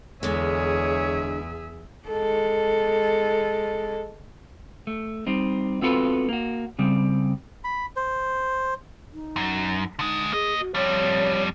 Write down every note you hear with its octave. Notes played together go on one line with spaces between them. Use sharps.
E2 D3 G#3 G#4 C#5 E5
G#3 A4
A3
G3 C4 D#4
B3 C4 F4 F#4 A4 B4
A#3 F#4
C#3 G3 C4
B5
C5
D#4
F#2
D3 G#3 D#4
A#3 G#4 D#5
F#4
F2 G3 C#5